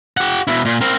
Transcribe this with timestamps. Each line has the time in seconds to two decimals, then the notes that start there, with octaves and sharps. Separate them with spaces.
0.17 G4 F#5
0.47 B2 E4
0.65 A#2
0.81 C4 A#4